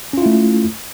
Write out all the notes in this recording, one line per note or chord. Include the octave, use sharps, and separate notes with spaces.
A3 C#4 E4 F4